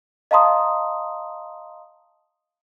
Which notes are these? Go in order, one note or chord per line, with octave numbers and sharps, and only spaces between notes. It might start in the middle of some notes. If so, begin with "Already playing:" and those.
D#5 F5 A5 A#5 C6 D#6